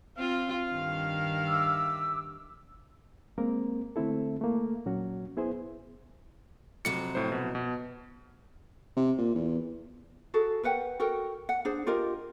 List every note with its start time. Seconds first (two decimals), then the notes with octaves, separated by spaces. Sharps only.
0.17 C4 F4 F5
0.73 G2 D#3
1.48 E5 D6 E6
3.38 G#3 A#3 C4 A#4
3.96 D3 A3 C4 E4 A4
4.41 A3 A#3
4.86 A#2 F#3 C#4 F#4
5.37 B3 E4 G#4 C5
6.85 F2 C3 F#3 C#7
7.15 A2 C5
7.32 B2
7.55 B2
8.96 C3
9.18 A#2
9.35 E2
10.34 F#4 G#4 A4
10.63 A#4 B4 F#5 G5
11.00 F#4 A4 A#4 G5
11.49 F#5
11.65 D4 G#4 C5
11.87 F4 G4 A#4 D#5